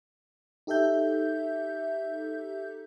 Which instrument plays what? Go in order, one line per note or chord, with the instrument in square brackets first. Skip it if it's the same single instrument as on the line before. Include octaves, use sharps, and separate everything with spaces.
[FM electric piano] D#4 G4 A4 E5 G6